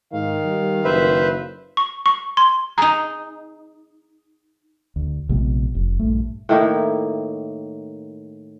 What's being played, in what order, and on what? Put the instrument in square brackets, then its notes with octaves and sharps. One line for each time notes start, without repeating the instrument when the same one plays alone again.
[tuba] G#2 [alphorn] D#3 [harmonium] F5
[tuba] G3
[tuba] F#1 [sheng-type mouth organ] B4 C5 E5
[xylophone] C#6
C#6
C6
[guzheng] D#4 G#4 [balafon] A#5
[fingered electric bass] D2
A#1 C3 G#3 B3
F1
A#1 G2 A3
[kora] A2 D#3 A#3 E4